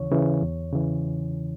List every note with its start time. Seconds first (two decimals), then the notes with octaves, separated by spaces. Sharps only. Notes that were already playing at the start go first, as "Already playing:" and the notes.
Already playing: D#2 C#3 E3 C#5
0.12 C#3 E3
0.42 E2
0.73 C#3 E3